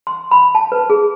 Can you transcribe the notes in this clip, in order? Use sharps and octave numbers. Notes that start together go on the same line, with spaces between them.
C6
B5
A5
B4
G#4